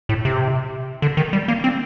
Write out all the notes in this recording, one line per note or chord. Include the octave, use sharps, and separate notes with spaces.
A2
C3
D3
D#3
G3
A#3
C4